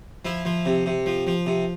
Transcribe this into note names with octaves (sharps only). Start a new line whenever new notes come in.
F3 E4
F3
C3
C3
F3
F3
C3